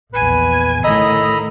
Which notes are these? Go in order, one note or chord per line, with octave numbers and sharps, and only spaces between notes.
A#1 E2 B4 G#5
A2 D3 D#3 D#5 A#5 B5 E6